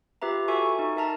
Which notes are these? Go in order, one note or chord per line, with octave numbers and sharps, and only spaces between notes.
F4 G4 B4 E5 A#5
F#4 A4 E5 G#5 C#6
D#4
A#4 E5 A5 A#5